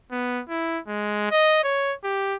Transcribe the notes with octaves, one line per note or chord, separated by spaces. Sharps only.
B3
E4
G#3
D#5
C#5
G4